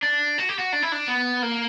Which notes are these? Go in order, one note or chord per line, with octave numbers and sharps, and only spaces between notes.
D4
F#4
G4
F#4
D4
E4
D4
B3
A#3